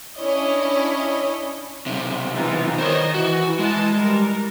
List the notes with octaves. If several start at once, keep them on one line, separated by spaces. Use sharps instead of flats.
C#4 D4 E4 C#5 D#5
B1 C3
E3 D#4 F4
D#3 C5 C#5 D#5
E3 F#4
E3 G#3 A5
G3 A#4